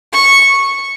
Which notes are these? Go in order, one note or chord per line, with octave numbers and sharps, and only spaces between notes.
C#6